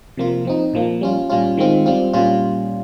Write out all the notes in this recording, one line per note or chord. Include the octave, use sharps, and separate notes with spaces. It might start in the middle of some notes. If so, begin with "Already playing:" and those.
C3 F3 A#3 F4
F3 C4 D#4
A#2 F3 A#3
G3 C#4 F4
A#2 G3 C#4 F4
D#3 G#3 C4 F4
G3 C4 F4
A#2 G3 C#4 F4